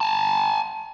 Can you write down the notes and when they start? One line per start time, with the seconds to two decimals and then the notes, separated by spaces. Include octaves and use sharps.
0.01 G#5 A5